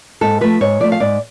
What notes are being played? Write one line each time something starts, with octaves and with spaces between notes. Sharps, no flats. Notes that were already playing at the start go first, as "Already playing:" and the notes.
G#2 A4
F3 A3 B4
G#2 C#5
F3 A3 D5
F5
G#2 D5